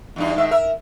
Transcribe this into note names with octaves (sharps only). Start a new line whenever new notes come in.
E2 G2 D#4
G#2 D#3 E5
A#4 E5